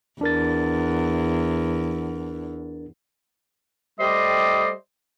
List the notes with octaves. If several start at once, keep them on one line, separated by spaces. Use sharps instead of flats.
E2 D4 A#4 A6
G3 A3 G4 C5 D5 D#5